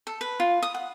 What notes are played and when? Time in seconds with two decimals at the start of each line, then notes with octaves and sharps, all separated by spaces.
0.07 A4
0.21 B4
0.40 F4
0.63 D#6
0.74 F#5